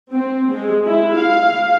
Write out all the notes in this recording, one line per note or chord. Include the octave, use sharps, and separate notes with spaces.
C4
G#3
E4
F5